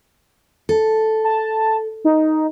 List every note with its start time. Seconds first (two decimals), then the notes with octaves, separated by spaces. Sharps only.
0.69 A4
1.25 A5
2.05 D#4